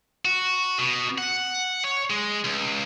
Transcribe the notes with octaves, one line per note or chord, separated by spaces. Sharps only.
F#4
B2
F#5
C#5
G#3
C#2